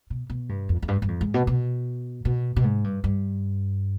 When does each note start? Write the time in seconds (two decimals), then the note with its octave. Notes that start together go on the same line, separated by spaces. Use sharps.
0.10 B2
0.30 B2
0.49 G2
0.69 F2
0.82 F2
0.88 G2
1.02 G2
1.08 F2
1.21 G#2
1.34 B2
1.47 B2
2.25 B2
2.56 B2
2.64 G#2
2.84 G2
3.04 G2